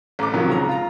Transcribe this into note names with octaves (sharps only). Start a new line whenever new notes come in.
A1 D6
C3 D#3 F3 F#3
C#2 C#3 A#5
F4 A#5